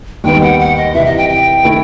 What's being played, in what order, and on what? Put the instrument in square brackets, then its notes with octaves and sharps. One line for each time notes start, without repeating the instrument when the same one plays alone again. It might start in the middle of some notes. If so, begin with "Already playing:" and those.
[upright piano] D#2 D#3 G3 B3 D#4 [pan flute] G5
[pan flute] F#5
F#5
D#5
[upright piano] C2 C3 E3 [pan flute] E5
[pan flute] D#5
G5
G5
[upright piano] D#3 A3 E4